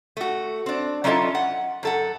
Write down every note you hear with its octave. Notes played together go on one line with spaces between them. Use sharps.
A3 F#4
C4 D4
F#3 C#4 E4 F4 A4 D#5
F#5
F#2 A4 F#5